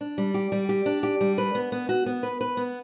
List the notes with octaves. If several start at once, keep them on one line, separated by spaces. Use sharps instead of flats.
D4
G3
G4
G3
G4
D4
G4
G3
B4
B3
B3
F#4
B3
B4
B4
B3